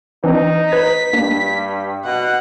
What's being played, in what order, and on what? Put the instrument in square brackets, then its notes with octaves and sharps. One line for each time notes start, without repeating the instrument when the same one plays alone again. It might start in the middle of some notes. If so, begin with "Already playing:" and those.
[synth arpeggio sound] E3 C4 D4 [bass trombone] D#4
[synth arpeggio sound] B4 G#6 [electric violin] B6
[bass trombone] G2 [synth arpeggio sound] A#3 D4
[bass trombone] B2 [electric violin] F#5